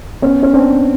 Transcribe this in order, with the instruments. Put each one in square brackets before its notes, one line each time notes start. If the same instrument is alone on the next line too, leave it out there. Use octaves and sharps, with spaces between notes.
[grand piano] B3 C#4
C#4
C4 D4